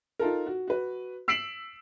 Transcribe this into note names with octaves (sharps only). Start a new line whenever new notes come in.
D#4 F4 A4 A#4
F#4
F#4 B4
E6 B6 C7 D7 E7 F#7